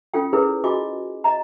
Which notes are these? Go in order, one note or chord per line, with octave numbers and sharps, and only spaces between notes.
C#4 F4 A4 G5
E4 G#4 A#4 B4 C#5
F4 F#4 D#5 G#5 D6
D#5 A#5